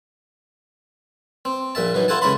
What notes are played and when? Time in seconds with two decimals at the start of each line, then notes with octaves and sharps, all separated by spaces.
1.45 C4
1.75 A#1 A#2 E5 A5
1.94 E3 F#3 D#4
2.08 E4 F4 A4 F#5 G#5 A5
2.22 C#2 C#4 E4 A5 B5 C6